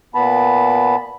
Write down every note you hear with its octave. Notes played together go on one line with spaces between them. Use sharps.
A#2 B3 A5 B5